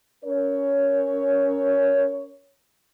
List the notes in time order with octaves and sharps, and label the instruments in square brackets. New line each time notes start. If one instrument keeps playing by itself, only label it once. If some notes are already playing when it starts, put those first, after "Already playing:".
[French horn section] C#4 A#4 C#5